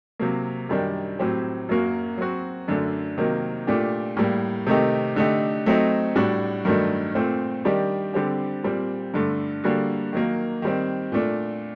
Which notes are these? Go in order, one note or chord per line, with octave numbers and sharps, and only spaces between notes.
C3 F#3 A#3
F#2 D#3 G3 D4
A2 F#3 C4 G4
F#2 F#3 A#3 F#4
F#3 C4 F#4
F#2 D3 A3 D4
C3 D#3 F#3 A#3
A#2 A3 D4 G4
A2 G3 A#3
C3 D#3 A3 D#4 G4
D3 A3 D#4 G4
F#3 A3 C4 D#4
A2 G3 D4 F#4
G2 D#3 F#3 A3 D4
A#2 A3 C4
D#3 G3 D4 G4
D3 G3 C4 G4
A#2 G3 C4
G2 D3 A3
D3 G3 A#3 F#4
D#3 F#3 A#3
D#3 G3 C4
A#2 A3 D4